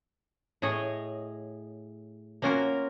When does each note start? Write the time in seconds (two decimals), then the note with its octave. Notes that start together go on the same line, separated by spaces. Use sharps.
0.62 A2 G#4 C#5 D#5
2.42 A#3 C#4 F4 F#4 A#4